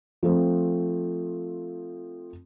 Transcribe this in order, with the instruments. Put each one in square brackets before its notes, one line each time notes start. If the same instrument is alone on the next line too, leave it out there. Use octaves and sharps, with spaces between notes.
[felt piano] F3 A3 C4